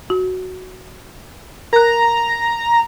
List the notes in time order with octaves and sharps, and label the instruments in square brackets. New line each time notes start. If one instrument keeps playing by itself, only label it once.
[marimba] F#4
[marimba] A#4 F#6 [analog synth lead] A#5